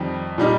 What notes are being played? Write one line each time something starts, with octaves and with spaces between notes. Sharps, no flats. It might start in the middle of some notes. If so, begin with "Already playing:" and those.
Already playing: F2 D#3 G3 D#4
A#2 G3 D#4